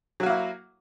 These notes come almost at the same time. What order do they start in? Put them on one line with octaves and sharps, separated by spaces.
F#3 F#4 A#3 E4